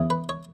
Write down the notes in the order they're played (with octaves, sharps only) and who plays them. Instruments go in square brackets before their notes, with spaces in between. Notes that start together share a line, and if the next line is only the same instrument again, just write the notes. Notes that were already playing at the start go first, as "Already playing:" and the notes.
Already playing: [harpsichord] E2 C#3 E3
B4
C#5